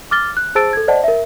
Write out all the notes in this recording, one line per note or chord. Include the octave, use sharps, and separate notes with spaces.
D6 F6 A6 G7
F#6
G#4 C5 A5 E6 A6 D7
A4 G#6
C5 D5 D#5 F#5 A5
A#4 E5